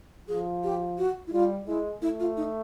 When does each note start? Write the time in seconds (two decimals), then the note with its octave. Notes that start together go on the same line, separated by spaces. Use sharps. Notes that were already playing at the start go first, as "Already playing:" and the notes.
0.28 F3 G#4
0.64 G4
0.98 F#4
1.27 E4
1.33 G3 F4
1.67 G#3 E4
2.02 A3 E4
2.20 F4
2.37 D#4